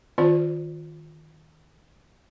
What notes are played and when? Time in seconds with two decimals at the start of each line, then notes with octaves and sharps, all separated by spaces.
0.18 D#3 C4 F4 C5 D5